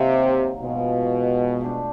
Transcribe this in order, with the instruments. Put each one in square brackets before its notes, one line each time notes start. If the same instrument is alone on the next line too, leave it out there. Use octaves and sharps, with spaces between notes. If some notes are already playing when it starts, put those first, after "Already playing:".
Already playing: [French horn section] C3 [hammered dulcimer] D#3 F#3 A#3 D#4
[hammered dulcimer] G#2 F3 G#3 [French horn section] B2
[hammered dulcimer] A3 D4 G4